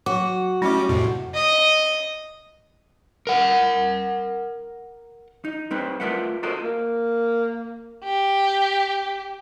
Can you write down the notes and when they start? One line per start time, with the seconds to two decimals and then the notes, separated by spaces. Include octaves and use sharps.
0.06 F#3 F#4
0.62 G3 A3 C#4 E4 D6
0.89 F2 A2 C3
1.35 D#5
3.27 A#4 F#5
5.45 D#4
5.71 G3 C4 B4 C5
6.00 A3 F4 A#4 B4 E5 F#5
6.43 F4 F#4 A4 A#4 C5 D#5
6.63 A#3
8.04 G4